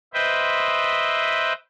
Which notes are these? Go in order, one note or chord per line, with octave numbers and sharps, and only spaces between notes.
B4 C5 D#5 E5 G5